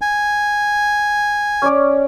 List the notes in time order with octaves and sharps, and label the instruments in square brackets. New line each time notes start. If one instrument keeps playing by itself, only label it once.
[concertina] G#5
[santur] C#4 C#5 D5